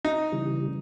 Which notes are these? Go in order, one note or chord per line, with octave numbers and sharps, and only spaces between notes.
D#4
C#3 E3 G3